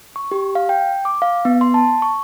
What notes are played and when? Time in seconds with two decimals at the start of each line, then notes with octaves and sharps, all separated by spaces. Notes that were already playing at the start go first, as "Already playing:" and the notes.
0.16 C#6
0.31 G4
0.55 F5
0.69 G5
1.05 D6
1.22 F5
1.45 B3
1.61 C6
1.74 A5
2.02 C#6